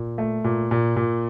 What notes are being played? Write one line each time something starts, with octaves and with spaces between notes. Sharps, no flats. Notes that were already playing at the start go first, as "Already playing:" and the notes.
Already playing: A#2
A3
A#2
A#2
A#2